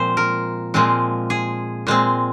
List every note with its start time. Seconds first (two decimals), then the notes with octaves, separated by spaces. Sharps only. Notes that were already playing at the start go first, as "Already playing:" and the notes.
Already playing: A#2 F3 G#3 C4 C5
0.17 A#4
0.74 A#2 F3 G#3 C4
1.30 G#4
1.87 A#2 G#3 C4